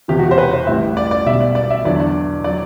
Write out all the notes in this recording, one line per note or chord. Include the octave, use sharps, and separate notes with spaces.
E1 E2 C3 E3 G4
F#4
G4
C5
B4
C5
A1 A2 G3 E5
D5
D5
B1 B2 G3 E5
D5
D5
E5
E2 D3 F#3 D5
D5
D5
F#3